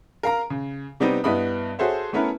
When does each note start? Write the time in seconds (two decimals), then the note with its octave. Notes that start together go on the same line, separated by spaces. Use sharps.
0.23 A#4 F5 A#5
0.50 C#3
1.00 C3 G3 B3 C4 D#4
1.24 G2 B3 E4 D#5 B5 D#6
1.79 F#4 G#4 A4 C5 C#5 E5
2.13 A3 B3 C#4 E4 A#4 B4